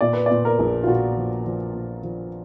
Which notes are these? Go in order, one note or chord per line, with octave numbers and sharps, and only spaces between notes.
A#2 D5
B4
A#2 D5
A#4
A#1
F4
A#2 F#4
F3
F3
A#2
F3